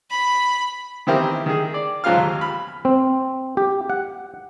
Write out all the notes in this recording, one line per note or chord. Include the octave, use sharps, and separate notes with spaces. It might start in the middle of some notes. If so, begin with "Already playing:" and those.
B5
D#3 E3 C4 E4 G4 A#4
D#3 G#4
D5
G#2 F3 F#3 F4 F5 F6
D#2
B5 F6
C4
G4
F#5